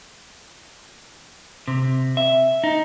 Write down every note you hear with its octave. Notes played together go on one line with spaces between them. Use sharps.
C3
E5
D#4